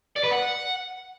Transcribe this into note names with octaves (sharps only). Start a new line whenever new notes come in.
D5
B4
F#5